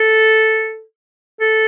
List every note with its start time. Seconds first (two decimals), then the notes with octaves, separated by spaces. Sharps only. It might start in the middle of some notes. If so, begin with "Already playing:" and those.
Already playing: A4
1.40 A4